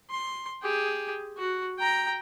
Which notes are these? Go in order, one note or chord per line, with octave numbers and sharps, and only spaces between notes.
C6
G4 G#4
F#4
G5 A#5